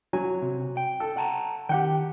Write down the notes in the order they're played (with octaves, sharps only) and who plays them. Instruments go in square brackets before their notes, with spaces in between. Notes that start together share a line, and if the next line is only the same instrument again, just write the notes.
[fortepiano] F#3 G#5
[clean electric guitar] C3
G5
[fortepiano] A4
[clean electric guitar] F#5 A5 A#5
[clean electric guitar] D#3 [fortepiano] G4 F#5 G5